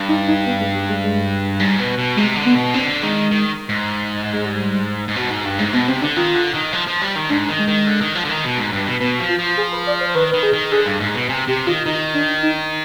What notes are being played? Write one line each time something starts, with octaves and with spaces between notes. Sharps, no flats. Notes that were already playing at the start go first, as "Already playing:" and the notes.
Already playing: G2
D#4
D#4
B3
G#3
G3
G#3
G#3
G#2 G3
B2
B2
C3 G#3
D3
B3
B2
D3 C4
D#3 G#3
D#3
G#2
G#3
G3
G#2
B2
G#2
G2
G#2 G#3
B2 B3
C3 C4
D3 D4
D#3 F4
D3
D#3
F3
F3
G3
D#3
G#2 D4
D#3
G#3
D#3
D3
D#3
F3
D3
D#3
B2
G#2
G2
B2
B2 B3
F3
F4
F3
G#4
B4
D5
C5
D#3 B4
D#3 B4
G#4
D#3
D3 G#4
G2
G#2
B2
C3 G#4
C3 G4
D#3 F4
D#3 D#4
D4
D#4